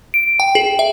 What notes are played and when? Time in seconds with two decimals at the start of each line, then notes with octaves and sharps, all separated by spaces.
0.14 D7
0.40 G5
0.55 G#4
0.79 E5